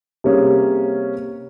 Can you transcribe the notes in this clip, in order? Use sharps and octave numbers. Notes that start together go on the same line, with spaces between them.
C3 G3 A#3 C#4 G#4